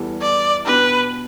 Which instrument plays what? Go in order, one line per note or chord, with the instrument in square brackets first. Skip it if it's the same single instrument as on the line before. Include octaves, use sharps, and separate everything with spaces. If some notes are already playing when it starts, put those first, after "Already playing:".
Already playing: [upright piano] E2 E3 G3 E4 A4
[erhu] D5
[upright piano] B2 B3 D4 G4 [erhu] B4